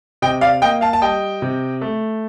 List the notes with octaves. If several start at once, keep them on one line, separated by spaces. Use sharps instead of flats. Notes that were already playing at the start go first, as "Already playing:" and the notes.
C3 D#5 G5
D5 F5
A#3 D#5 G5
F5 A5
A5
G3 D#5 G5
C3
A3